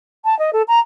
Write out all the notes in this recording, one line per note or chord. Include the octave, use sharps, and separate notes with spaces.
A5
D#5
A4
A#5